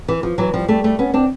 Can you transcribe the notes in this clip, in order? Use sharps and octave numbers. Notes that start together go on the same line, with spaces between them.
E3
F3
E3 F#3
F3 G3
G3 A3
G3 A3
B3 C#4
C4 D4